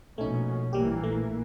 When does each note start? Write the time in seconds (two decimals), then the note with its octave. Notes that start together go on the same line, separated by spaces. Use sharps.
0.18 A#1 B2 A3 C#4 D#4
0.73 A#1 E3 G3 A#3 G4
1.03 A3